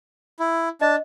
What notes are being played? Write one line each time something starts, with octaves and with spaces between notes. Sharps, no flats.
E4
D4 D#5 A5